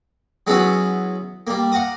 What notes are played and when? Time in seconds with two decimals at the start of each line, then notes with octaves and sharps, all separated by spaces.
0.47 F#3 G#3 B3 C#4 E4 F#4
1.47 G3 A#3
1.72 F5 F#5 A#5 D6 D#6